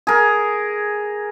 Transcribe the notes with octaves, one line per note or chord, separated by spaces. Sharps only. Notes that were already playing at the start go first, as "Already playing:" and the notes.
G#4 A#4